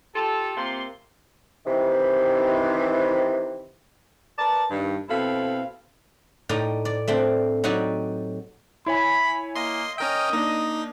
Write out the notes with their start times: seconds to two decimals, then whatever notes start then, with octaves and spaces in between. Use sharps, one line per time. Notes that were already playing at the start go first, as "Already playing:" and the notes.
0.14 F4 G4 A4
0.56 C3 A#3 F4 C6
1.66 C3 D#3 E3
4.38 A#4 B4 D5 A5
4.71 G2 D#3
5.09 B2 C4 E4 A4 F5 B5
6.49 A2 D#4 D5 G5 A#5
6.85 D5
7.08 A3 C4 D4
7.64 F#3 D#4 F#4 G4 D5
8.86 E4 C#5 G#5 B5
9.55 A#3 D#5 C6
9.98 C#4 A#4 D#5 G5
10.33 A#3 D4 D#4